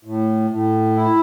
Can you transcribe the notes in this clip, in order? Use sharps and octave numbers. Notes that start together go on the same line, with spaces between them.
A2
A2
E4